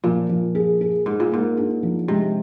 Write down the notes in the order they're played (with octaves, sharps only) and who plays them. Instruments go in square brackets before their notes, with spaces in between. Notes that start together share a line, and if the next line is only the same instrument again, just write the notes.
[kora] A#2 [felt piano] F3
[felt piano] F3
G#4
G#4
[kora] G#2 [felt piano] G#4
[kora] A#2
[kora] G#2 [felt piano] A#3
[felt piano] D4
F3
[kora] C3 [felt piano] G#3